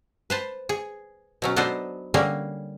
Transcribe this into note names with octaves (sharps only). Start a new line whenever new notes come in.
B4 C5 A5
G#4
B2 F#3 C#4
B3 D4 D#4 A4 B4 C5
D3 G3 A#3 C#4 G#4